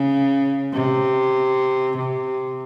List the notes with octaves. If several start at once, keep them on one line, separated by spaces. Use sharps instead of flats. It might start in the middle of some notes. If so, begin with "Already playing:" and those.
Already playing: C#3
C3
C3